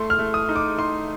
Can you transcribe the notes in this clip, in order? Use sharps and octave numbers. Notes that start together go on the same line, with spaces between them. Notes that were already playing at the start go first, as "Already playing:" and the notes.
Already playing: A3 C6
F6
A3
D#6
D#4
D6
D#4 C6